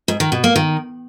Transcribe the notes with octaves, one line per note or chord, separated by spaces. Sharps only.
G#2
D#3
B2
A#3
D#3